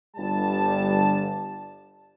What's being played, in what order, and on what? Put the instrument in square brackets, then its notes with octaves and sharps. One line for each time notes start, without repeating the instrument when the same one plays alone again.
[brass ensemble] G1 G3 A5